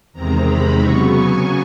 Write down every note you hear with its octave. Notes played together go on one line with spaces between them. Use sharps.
E2 C3 D#3 G#3 C4 A#5
B5
C#3 F#3 B3 C#6
G#5